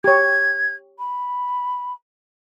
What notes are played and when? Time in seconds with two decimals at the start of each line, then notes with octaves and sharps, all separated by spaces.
0.04 G4 C#5 G#6
0.99 B5